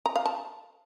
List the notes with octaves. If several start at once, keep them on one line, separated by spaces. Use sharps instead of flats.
A#5
F5
A5